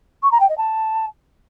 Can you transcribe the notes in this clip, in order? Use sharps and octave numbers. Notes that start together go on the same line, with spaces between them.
C#6
A#5
G5
D#5
A5